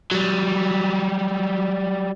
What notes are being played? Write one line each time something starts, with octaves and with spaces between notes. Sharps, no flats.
F#3 G3